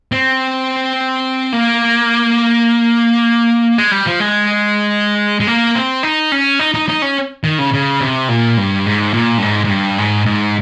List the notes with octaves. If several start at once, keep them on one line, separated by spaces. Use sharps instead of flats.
C4
A#3
G#3
G3
F3
G#3
G#3
A#3
C4
D#4
C#4
D#4
D#4
D#4
C#4
D#3
C#3
C#3
C3
A#2
G2
G#2
A#2
G2
G#2
G#2
G2
G#2
G#2